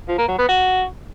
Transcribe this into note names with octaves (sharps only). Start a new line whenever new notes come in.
F3
A#3
F#3
B3
F#4